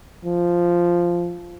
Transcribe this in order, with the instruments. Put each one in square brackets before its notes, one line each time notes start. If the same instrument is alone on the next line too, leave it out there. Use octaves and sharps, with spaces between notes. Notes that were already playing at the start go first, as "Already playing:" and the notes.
[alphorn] F3